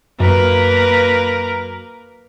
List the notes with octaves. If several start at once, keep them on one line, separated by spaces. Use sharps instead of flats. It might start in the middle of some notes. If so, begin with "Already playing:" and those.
F#2 A#3 A#4 B4